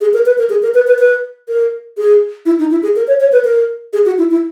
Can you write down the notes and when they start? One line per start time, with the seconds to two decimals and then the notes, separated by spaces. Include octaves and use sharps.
0.01 G#4
0.14 A#4
0.26 B4
0.38 A#4
0.50 G#4
0.62 A#4
0.74 B4
0.87 B4
0.99 B4
1.49 A#4
1.98 G#4
2.46 E4
2.59 D#4
2.71 E4
2.83 G#4
2.96 A#4
3.07 C#5
3.20 C#5
3.32 B4
3.44 A#4
3.93 G#4
4.06 F#4
4.18 E4
4.31 E4